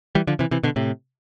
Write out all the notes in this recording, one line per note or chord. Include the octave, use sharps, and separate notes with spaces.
E3 G3
D3 F3
C3 E3
C3 E3
B2 D3
A2 C3